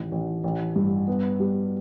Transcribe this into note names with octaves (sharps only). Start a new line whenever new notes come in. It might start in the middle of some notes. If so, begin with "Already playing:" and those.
Already playing: A1 D#3
A1
A1
G2
B3
G3